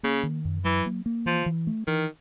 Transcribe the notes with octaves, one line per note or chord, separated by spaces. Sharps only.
C#3 A#3
D#3
F#2
E3 F#3
A#3
A#3
E3 F3
E3
A3
D#3 E3